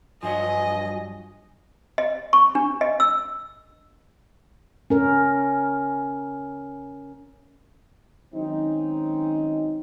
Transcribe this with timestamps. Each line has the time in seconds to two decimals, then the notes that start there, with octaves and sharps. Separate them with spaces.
0.23 G2 F3 F#3 D#5 G#5
1.98 D#5
2.33 C#6
2.55 D4
2.81 D#5
3.00 E6
4.90 C#4 A#4
8.34 D#3 F#3 G#3 C4 C#4 D#4